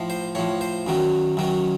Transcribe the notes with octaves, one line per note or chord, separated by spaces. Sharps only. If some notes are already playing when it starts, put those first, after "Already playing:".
Already playing: A2 F3
C5
A2 F3 C#5
C5
F#2 D#3 F#3
F#2 D#3 F#3